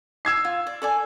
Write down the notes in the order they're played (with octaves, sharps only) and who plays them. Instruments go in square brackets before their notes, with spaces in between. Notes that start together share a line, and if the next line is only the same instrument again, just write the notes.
[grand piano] E6 G#6 C7
[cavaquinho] F4
D5
A4 D5 G#5